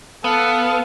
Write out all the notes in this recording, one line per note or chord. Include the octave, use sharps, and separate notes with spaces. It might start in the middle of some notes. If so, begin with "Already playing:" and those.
B3 A4 F5